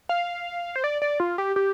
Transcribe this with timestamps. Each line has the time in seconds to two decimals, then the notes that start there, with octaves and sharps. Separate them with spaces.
0.09 F5
0.76 C5
0.84 D5
1.02 D5
1.20 F4
1.38 G4
1.56 G4